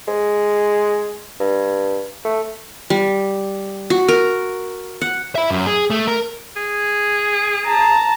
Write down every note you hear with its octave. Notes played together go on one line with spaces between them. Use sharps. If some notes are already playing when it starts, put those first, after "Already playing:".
G#3
G2
A3
G3
F#4
A#4
F#5
E5 B5
F#2
G#4
A3
A#4
G#4
A5 A#5